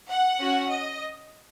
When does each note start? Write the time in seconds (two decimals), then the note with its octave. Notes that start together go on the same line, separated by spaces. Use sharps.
0.10 F#5
0.39 C#4 F#4
0.70 D#5